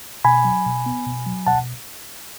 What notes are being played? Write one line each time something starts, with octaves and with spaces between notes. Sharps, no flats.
B2 G#5 B5
F#3
B2
B3
B2
F#3
B2 F#5 A5